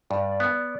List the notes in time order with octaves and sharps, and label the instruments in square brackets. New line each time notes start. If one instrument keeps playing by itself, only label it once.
[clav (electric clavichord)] G2 [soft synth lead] D5
[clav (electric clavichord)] B3